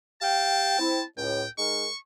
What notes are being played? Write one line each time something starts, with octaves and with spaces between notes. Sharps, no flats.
G4 F5 G5 A5
C4 E4
C#2 A2 G5
G#3 D#4 A#4 C#6